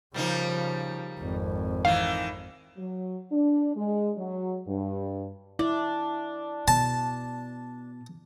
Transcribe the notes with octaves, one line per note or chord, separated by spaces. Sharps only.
C#3 F3 G3 A#3 D#4
G#1 F2
D#3 E3 F5
F#3
D4
G#3
F#3
G2
D4 E4
B2 A5